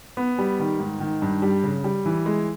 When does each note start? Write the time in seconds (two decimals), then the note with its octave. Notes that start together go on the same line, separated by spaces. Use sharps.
0.17 B3
0.38 G3
0.59 D#3
0.80 G#2
1.00 D#3
1.22 G2
1.42 G3
1.64 C#3
1.84 G3
2.06 E3
2.26 G#3